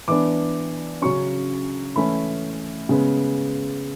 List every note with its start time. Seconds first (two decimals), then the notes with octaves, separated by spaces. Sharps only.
0.08 E3 B3 D4 D6
1.02 C#3 F#3 C#4 C#6
1.96 E3 A3 C#4 B5
2.89 C#3 G#3 B3